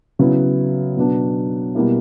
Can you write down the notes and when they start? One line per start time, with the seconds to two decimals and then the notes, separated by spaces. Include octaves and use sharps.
0.19 C#3 F#3 B3 E4
0.97 B2 F#3 B3 D4
1.75 B2 G3 A#3 E4